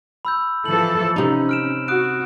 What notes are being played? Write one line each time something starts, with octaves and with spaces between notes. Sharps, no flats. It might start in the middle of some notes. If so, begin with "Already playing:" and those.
B5 E6 G6
E3 F3 A4 F#7
C3 C#4 D#4
F6 D7 E7
F#4 D#6 F#6 D7